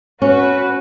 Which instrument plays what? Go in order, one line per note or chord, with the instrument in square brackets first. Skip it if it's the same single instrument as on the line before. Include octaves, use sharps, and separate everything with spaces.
[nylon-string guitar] C#4 [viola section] F#4 B4